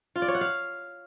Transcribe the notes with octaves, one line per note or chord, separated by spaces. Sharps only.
F4
D5
C#5
F#5
F5